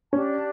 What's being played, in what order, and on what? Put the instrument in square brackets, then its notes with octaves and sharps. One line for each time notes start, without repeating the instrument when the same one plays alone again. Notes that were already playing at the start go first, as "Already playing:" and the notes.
[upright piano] C#4 [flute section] D4 G4 D5 A5